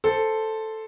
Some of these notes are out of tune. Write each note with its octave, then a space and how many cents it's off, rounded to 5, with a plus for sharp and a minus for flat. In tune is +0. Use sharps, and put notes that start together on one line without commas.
A4 +0 C5 +0